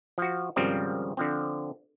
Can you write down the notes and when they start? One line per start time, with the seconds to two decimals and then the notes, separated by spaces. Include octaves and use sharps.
0.18 F3 F#4
0.56 G#1 C#3 F3 G3 C4 A#4
1.17 D3 F3 C4